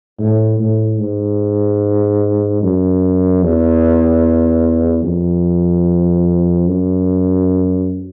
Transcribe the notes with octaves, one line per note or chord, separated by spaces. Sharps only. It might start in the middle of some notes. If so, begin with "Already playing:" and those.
A2
A2
G#2
F#2
E2
F2
F#2